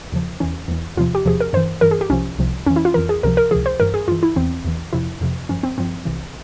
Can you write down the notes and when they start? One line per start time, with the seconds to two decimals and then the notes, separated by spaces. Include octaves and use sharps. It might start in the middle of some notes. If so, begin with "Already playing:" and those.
0.12 E2 C#3 F3
0.40 E2 E3 C#4
0.68 E2 E3
0.97 E2 C3 F3 F4
1.15 G4
1.25 E2 C3 F3 G#4
1.40 A#4
1.53 G2 E3 C5
1.81 G2 E3 A#4
1.91 G#4
2.01 G4
2.10 C2 C3 F3 C#4
2.38 C2 C3 F3
2.66 F2 C#4
2.70 E3
2.76 E4
2.85 F4
2.94 F2 E3 A#4
3.09 G#4
3.23 C#2 C3 F3 A#4
3.37 A#4
3.51 C#2 C3 F3 G#4
3.66 C5
3.80 G2 E3 A#4
3.94 G#4
4.08 G2 F4
4.12 E3
4.23 E4
4.36 E2 E3 C4
4.65 E2 E3
4.93 F2 C3 F3 E4
5.21 F2 C3 F3
5.49 G2 F3 C#4
5.63 C4
5.78 G2 F3 C4
6.05 C2 C3 E3